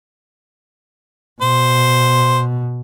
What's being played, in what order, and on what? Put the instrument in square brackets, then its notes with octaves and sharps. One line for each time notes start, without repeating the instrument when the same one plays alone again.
[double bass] B2 [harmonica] C5